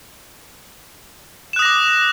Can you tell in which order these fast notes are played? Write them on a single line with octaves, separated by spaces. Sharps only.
E7 F#6 D#6 A#6 D6